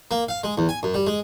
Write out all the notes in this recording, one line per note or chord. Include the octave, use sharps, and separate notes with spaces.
A#3
F5
G#3
E2
G#5
F#2
G3
G#3